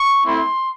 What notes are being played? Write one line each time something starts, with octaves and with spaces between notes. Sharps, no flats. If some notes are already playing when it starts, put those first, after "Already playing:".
Already playing: C#6
A3 C4 E4 C6